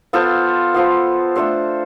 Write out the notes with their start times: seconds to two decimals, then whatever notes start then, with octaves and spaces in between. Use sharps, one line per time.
0.13 B3 F4 A4 C5
0.74 B3 F4 A4 C5
1.36 A3 D4 A4 C5